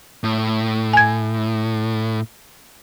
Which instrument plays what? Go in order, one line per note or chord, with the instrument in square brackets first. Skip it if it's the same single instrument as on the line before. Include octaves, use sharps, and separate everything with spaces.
[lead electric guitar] A2
[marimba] G#5 G#6